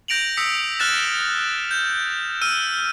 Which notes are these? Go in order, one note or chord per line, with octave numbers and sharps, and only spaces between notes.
G6 A#6 D7 F7 F#7
D#6 E6 B6 C#7
F6 F#6 A6 E7
G6
E6 F6 D#7